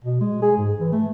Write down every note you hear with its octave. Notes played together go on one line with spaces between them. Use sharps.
B2
G#3
G#4
G#2
E3
A3